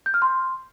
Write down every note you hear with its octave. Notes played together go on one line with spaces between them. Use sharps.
G6
F6
C6